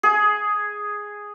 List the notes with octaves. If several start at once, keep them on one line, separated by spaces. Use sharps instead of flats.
G#4